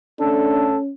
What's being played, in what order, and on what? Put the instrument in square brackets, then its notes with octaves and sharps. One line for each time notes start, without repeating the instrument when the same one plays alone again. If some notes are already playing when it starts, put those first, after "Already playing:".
[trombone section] A3 A4 [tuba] C#4 [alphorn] D4